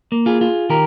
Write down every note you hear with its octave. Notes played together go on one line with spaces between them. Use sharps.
A#3
F4 G#4
F4
D#3 G4 A#4